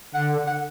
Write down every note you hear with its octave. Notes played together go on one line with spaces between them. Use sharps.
D3 F#5
F#5